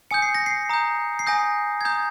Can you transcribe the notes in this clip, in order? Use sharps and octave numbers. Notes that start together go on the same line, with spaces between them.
G#5 D#6 G6 C#7
C7
A#6
C7
A#5 D#6 G6
C7
G#5 D#6 G6 A#6
G#6
A#5 D#6 G6